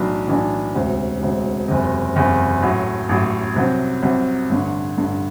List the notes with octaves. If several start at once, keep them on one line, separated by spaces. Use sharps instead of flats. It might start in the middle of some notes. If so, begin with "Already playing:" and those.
Already playing: B1 A2 E3 B3 D4
B1 A2 E3 B3 D4
E1 D2 C3
E1 D2 C3
F#1 E2 C3
F#1 E2 C3
A1 A2 F#3
A1 A2 F#3
C2 C3 F#3 C4
C2 C3 F#3 C4
A1 G2 D3
A1 G2 D3